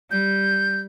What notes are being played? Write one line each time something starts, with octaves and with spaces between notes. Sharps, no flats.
G3 G6